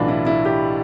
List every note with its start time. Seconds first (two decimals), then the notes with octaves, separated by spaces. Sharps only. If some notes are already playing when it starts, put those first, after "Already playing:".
Already playing: B1 A2 E3 D4 F4
0.08 E4
0.26 E4
0.46 G4